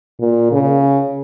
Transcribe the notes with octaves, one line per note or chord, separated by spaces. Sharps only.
A#2
C#3